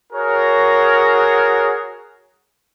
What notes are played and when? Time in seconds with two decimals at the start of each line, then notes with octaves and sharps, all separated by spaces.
0.13 F#4 G#4 A#4 C#5